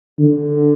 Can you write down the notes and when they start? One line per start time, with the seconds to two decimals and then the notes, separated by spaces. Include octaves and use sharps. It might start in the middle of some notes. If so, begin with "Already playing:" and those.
0.19 D3